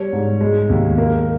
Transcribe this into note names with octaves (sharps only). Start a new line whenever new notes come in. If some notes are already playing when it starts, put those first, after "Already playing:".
Already playing: G3 C#5
G#2
G#3
D#2
A#3